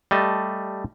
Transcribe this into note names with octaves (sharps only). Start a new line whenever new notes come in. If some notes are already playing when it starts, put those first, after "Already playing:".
G3 A3 D#5 A5